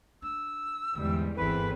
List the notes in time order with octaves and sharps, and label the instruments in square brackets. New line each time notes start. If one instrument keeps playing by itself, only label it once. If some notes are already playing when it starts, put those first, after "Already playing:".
[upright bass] D4 [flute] E6
[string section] E2 G#2 G3 [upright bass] D3
[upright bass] G1 G#2 [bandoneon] E2 B4 [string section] E3 A3 C4 [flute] B5